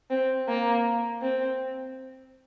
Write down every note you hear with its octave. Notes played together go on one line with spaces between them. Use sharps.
C4
A#3
C4